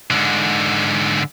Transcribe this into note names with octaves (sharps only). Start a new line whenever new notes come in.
G#2 D3